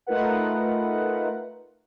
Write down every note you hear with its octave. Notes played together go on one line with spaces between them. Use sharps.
A3 D#4 F4 A#4 B4 F#5